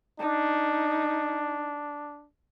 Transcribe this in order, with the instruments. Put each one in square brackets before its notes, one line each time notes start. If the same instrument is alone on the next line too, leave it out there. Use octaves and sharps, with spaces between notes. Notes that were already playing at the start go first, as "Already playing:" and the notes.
[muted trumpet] D4 [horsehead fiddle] D#4